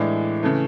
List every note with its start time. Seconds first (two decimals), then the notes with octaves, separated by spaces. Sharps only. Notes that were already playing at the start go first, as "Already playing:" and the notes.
Already playing: A2 E3 G#3 D4
0.43 C#3 E3 A3